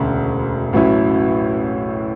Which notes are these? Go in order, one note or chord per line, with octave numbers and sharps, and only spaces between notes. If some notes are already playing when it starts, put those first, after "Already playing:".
Already playing: E1 D2 C#3
A1 A2 F#3 C#4 E4